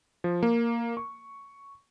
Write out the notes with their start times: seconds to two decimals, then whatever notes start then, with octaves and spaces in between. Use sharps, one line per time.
0.24 F3
0.43 A#3
0.97 C#6